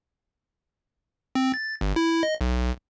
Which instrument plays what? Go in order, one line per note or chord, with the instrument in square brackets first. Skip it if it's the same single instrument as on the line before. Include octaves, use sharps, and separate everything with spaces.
[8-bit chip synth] C4
A6
G1
E4
D#5
B1